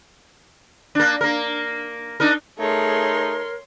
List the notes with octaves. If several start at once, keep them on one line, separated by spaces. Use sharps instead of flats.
A#3 D4
A#3 A#4
D4 D#4 A#4
A3 D#4 G#4 A#4 C#5 C6